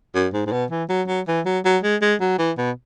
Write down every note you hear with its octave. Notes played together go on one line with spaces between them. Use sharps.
F#2
G#2
G#2
B2
E3
F#3
F#3
E3
F#3
F#3
G#3
G#3
F#3
E3
B2